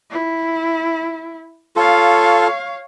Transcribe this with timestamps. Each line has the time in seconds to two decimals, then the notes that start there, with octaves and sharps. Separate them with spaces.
0.11 E4
1.76 F4 A4 C#5 F5